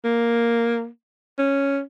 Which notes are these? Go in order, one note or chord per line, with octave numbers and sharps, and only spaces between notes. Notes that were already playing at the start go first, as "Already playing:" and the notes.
A#3
C#4